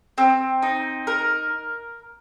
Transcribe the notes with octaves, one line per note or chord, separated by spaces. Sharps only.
C4
D#4
A#4